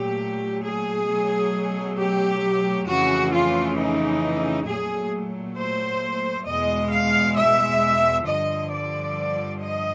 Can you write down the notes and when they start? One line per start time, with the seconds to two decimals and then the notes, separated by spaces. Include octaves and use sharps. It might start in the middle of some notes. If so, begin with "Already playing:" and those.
Already playing: A#2 F#3 A3 G4
0.64 G#4
1.09 B2 F#3 A3
1.99 G4
2.88 F2 C#3 E3 A3 F#4
3.34 F4
3.78 D#4
4.67 A#2 F#3 A3 G#4
5.58 C5
6.47 E2 B2 G#3 D#5
6.93 F5
7.37 E5
8.28 G2 D3 F3 D#5
8.72 D5
9.62 D#5